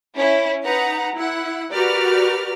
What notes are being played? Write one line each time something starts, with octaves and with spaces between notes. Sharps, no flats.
C#4 E4
D#4 B4 F#5 A#5
E4 F#5
F#4 G4 A#4 B4 D5 F6